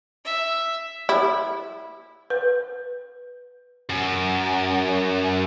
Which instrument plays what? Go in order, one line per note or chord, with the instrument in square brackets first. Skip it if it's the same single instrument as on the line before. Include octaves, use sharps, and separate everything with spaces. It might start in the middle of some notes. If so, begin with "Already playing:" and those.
[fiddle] E5
[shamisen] E4 [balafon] G4
[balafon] B4
[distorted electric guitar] F#2